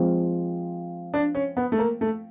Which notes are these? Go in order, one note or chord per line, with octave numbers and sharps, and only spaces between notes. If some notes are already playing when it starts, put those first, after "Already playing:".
Already playing: F3 G#3 C4 F4
D4
C#4
B3
A3
A#3
A3